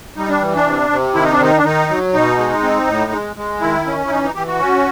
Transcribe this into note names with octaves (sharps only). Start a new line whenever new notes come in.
G3 D#4
D4
E3
D4
C3
C3
D#3 E4
D#4
D4
D#3 D#4
D4
D#3 D#4
F#3
B2 D#4
G#3
C4
A2
G#3
G#3
D#3 E4
C#4
E4
E3 D#4
D#4
E3 G4
F#4
C#4